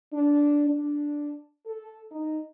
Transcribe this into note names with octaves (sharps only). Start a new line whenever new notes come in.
D4
D4
A4
D#4